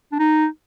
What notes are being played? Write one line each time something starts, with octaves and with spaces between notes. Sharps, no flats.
D4
D#4